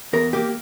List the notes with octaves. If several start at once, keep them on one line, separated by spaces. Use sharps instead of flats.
E2 A#4
A#3 G4